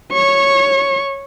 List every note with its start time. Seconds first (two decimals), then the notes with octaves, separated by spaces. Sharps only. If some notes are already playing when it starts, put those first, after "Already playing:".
0.13 C#5 C#6